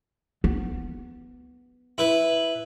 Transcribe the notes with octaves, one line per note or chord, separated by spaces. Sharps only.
B3
E4 B4